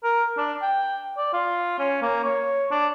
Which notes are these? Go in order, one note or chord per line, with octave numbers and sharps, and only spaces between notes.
A#4
D4
G5
D5
F4
C#4
A#3
C#5
D4